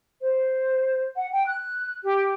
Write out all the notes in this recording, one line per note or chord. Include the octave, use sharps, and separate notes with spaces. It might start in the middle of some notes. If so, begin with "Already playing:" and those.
C5
F#5
G5
F#6
G4